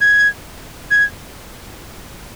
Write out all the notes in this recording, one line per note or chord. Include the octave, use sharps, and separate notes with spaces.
G#6
G#6